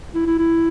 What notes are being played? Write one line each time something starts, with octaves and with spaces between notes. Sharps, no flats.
E4
E4
E4